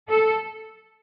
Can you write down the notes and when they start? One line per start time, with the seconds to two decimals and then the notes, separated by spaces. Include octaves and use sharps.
0.09 A4